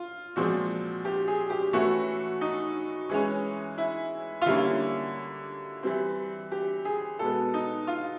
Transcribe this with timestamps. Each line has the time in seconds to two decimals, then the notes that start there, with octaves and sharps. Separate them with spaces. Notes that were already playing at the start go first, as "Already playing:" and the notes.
Already playing: F4
0.36 A#2 F3 G#3 C4 F#4
1.05 G4
1.28 G#4
1.50 G4
1.73 E3 A3 C#4 F#4
2.41 D#4
3.09 E3 G#3 C#4
3.78 E4
4.42 F4
4.46 D3 G3 A#3 C#4 E4
5.83 E3 G3 C4
6.52 G4
6.85 G#4
7.19 B2 G#3 B3 A4
7.54 D#4
7.87 F4